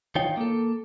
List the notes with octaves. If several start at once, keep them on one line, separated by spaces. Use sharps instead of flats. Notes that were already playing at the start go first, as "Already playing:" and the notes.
D#3 D#4 F4 C#5 G5
A#3 A4